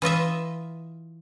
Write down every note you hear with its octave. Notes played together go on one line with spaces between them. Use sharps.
E3 F4 D#5 E5